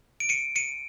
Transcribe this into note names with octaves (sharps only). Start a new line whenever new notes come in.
D7
C#7 D#7
C#7 D#7